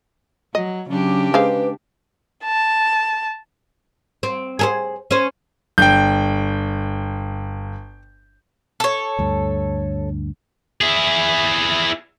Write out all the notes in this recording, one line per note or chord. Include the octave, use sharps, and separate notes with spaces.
F#3 D#5
C#3 F#3 D4 G4
G#3 B4 C5 F5
A5
C4
G#4 A4 C5
C#4 C5
G1 G5 G6
A4 C#5
D2 G2 D3
E4 G#4